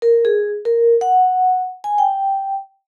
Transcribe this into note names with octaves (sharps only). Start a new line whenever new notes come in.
A#4
G#4
A#4
F#5
G#5
G5